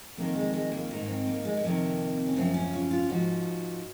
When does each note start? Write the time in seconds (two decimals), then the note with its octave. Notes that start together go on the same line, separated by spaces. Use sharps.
0.17 F2 D#3 A#3
0.35 G#3
0.53 G#3
0.72 A#3
0.91 G#2 D#3 A#3
1.08 C4
1.27 A#3
1.45 G#3
1.57 G#3
1.64 F2 C3 D#3 A#3
2.26 C#4
2.36 F#2 C#3 F3 C4
2.54 C#4
2.73 F4
2.91 F4
3.09 G#2 F3 F#4